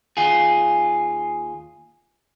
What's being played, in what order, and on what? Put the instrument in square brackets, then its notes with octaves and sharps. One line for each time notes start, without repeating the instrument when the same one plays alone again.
[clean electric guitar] D#2 F4 G#4